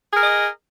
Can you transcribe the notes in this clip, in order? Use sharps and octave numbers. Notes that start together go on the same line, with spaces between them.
G#4 A#4 D#5